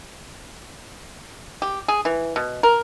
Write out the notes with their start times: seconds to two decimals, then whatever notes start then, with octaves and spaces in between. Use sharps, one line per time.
1.62 G4
1.88 G#4
2.05 E3
2.36 B2
2.63 A#4